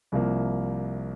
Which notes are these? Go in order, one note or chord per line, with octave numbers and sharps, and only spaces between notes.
C2 C3 F3 A#3